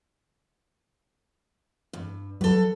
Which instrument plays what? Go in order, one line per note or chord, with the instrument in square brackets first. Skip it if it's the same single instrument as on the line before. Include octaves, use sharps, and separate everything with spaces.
[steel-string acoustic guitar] G2
[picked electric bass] F#3 G3 [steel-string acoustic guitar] A4 B4